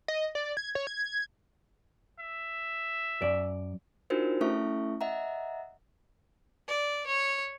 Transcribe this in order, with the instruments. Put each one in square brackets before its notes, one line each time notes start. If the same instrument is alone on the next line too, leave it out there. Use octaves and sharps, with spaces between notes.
[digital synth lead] D#5
D5
G#6
C#5
G#6
[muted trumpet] E5
[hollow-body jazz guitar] F#2 D5
[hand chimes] D4 D#4 F4 F#4 A#4 C5
A3 C#4 E4 A4 E5 C#6
D#5 E5 F#5 A#5
[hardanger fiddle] D5
C#5